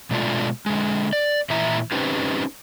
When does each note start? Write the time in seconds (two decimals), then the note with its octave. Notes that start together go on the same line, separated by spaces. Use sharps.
0.11 B2 G#3 A3 D4 F4
0.66 D3 G#3
1.13 D5
1.50 A#2 E3 E4 E5 A#5
1.92 C4 C#4 D#4 G4 B4 C5